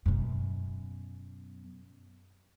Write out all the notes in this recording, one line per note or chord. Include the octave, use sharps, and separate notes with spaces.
F#2 B2